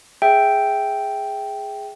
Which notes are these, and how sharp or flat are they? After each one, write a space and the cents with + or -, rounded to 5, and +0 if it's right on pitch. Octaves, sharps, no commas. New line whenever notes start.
G#4 +0 E5 +0 G5 +0